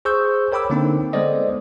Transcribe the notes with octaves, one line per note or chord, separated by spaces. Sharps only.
G#4 C5 C#6 E6 G6
A#4 C#5 G5 B5 D6 E6
D3 A#3 C4 D4 D#4
G#3 B3 A4 C5 D5 D#5